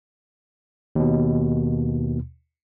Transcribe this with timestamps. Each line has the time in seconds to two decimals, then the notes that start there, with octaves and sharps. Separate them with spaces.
0.95 D#2 B2